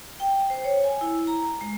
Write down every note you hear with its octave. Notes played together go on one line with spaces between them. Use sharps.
G5
C5
C#5
G#5
E4
A#5
G#3